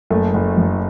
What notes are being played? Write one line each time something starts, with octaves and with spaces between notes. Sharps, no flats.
F#1 A3
F#1
F#2